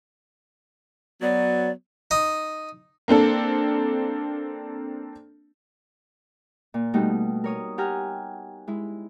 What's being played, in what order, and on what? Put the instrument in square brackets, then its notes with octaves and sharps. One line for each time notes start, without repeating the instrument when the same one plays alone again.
[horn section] F#3 B3 [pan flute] D5
[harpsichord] D#4
[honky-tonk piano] A#3 C4 D4 A4
[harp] A#2
B2 G3 A3 D#4 F#4
A#4 C#5 D#6
G4 F#5 G#5 A#5 F6
G#3 E4